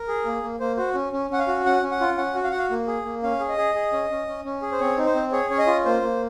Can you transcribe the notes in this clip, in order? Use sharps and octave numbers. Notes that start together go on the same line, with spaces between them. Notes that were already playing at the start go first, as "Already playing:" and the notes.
Already playing: A#4
G#4
A#3
A#3
A#3 C5
F#4 C5
C#4
C#4
C#4 F#5
F5
F#4
C#4 F#5
C#4
F#5
F4
C#4 F#5
F#4
F5
F#4 F#5
F5
A#3
G#4
A#3
C#4 F5
G#4
D#5
G#4
G#4
C#4
C#4
C#4
C#4
G#4
C5
C4 C#5
D#4
C5
C4
G#4 C#5
C#4 C#5
D#5
F4
A#3 C5
A#3